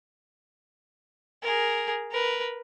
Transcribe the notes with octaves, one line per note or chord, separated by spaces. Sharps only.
G#4 A#4
A#4 B4